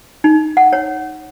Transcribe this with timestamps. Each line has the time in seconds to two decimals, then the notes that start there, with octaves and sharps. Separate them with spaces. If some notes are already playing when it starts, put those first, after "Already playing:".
0.24 D#4
0.57 F#5
0.73 C#5